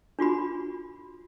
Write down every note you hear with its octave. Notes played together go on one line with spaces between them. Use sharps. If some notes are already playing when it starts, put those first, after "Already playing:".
D4 F4 F#4 B5